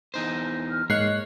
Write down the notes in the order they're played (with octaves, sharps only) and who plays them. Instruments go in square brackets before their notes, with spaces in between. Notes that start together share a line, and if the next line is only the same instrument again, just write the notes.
[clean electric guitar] E2 D#4 C5
[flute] F6
[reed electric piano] G#2 G#3 A#3 [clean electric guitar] C#5 [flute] D#5 [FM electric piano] F#6 C7